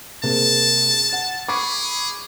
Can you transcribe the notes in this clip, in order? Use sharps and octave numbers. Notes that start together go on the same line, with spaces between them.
C3 A#3 G#4 A5
F#5
G#4 B5 C#6 D6